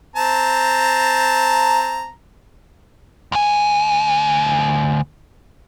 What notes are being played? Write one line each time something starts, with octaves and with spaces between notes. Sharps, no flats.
C4 A5 A#5
D2 G#5